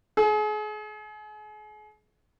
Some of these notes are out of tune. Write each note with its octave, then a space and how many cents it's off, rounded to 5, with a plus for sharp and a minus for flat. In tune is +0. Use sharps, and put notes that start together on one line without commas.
G#4 +35